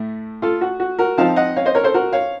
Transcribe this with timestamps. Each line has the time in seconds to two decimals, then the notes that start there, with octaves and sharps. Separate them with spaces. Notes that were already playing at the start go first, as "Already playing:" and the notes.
Already playing: A2 A3
0.42 F4 A4
0.61 F#4
0.80 F#4
0.99 F#4 A#4
1.18 F3 C4 D#4 F5 A5
1.36 D#5 F#5
1.56 C#5 F5
1.65 C5 D#5
1.75 A#4 C#5
1.84 A4 C5
1.94 F#4 A#4
2.13 C#5 F5